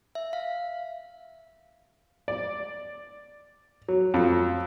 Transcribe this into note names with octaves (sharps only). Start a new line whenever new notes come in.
E5
F5
D5
F#3
F2